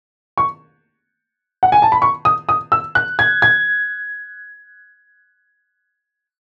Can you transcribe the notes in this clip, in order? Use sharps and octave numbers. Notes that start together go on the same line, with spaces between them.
C#6
F#5
G#5
A5
B5
C#6
D#6
D#6
E6
F#6
G#6
G#6